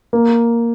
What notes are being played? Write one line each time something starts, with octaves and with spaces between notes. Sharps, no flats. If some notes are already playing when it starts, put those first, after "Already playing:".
A#3